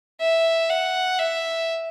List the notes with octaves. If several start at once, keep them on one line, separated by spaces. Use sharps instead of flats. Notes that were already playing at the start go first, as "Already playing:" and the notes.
E5
F#5
E5